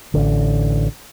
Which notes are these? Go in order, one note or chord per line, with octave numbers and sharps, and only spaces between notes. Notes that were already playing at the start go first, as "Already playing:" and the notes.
A1 D3